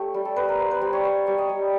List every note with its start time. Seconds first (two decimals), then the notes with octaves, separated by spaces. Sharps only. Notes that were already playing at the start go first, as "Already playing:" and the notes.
Already playing: A3 G4 C#5
0.14 G3
0.25 A4
0.36 B3 B4
0.49 A#4
0.59 B3 C5
0.71 B4
0.81 G3 C5
0.93 C#5
1.04 B3 C#5
1.27 G3 C#5
1.38 D#5
1.49 G3